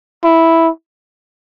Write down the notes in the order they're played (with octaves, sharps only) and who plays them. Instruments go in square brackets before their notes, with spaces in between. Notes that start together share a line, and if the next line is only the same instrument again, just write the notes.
[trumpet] E4